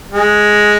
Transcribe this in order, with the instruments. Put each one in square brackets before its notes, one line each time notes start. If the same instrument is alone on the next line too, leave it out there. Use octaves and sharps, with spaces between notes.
[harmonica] G#3